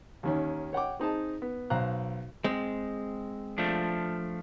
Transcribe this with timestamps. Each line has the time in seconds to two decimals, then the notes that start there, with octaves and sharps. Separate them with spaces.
0.23 D#2 D#3 C#4
0.73 C#5 F#5 G5 D6
1.00 C4 D#4 G#4 A5
1.42 B3
1.70 B1 C5 F5 A#5 F#6
2.44 G#3 C4
3.58 F3 A3 D4